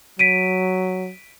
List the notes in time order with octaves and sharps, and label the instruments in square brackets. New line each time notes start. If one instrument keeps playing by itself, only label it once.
[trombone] F#3 [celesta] B6 D7 D#7